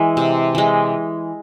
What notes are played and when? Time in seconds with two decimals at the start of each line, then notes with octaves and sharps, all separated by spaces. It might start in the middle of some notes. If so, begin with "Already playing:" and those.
Already playing: E3 G#3
0.17 C3
0.55 E3 G#3